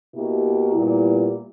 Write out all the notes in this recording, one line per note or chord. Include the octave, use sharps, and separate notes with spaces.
B2 A#3 E4 G4 A#4
A#2 G3 B3 E4